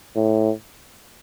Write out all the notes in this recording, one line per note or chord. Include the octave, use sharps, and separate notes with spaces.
A2